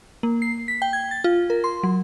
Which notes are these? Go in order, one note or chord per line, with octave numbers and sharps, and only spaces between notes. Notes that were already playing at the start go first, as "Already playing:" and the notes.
A#3
C7
B6
G5
G#6
A6
F4
A#4
C6
F#3